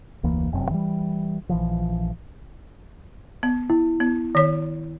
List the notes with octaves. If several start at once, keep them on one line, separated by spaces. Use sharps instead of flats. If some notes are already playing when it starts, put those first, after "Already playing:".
F1 D2 E3 A#3
F1 F#2 C3
E3 G3
A#1 E3 F3
B3
E4
B3
D#3 C#5